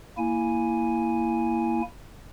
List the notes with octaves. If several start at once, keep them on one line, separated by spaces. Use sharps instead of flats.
A#3 E4 G#5